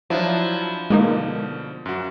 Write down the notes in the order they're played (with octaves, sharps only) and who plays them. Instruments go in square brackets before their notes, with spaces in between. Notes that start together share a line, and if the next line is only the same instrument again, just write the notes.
[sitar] F3 [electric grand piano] F#3 D4 E4
[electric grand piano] B2 D3 [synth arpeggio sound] G#3 A#3 D#4
[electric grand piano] F#2 F#4